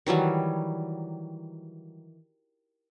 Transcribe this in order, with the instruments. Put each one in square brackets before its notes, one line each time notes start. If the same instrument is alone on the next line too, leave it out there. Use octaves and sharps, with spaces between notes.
[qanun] D#3 E3 F#3 G3